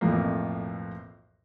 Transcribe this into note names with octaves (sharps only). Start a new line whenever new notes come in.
B1 F2 A2 F3 A3 A#3